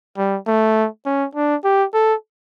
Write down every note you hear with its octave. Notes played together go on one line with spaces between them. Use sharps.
G3
A3
C#4
D4
G4
A4